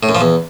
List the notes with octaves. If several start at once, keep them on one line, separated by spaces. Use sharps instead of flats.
A2
F#2
F3
E2